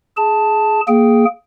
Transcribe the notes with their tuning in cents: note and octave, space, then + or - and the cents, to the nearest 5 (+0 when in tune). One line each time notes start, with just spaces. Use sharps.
G#4 +15 A5 +0
A#3 +0 G#4 +5 G5 -10